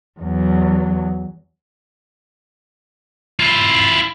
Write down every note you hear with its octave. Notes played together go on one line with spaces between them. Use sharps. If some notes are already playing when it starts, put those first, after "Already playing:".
E2 F#3
E4 F4